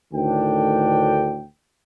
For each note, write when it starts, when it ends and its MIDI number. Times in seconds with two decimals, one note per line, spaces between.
0.13 1.43 38
0.13 1.43 45
0.13 1.43 51
0.13 1.43 62
0.13 1.43 79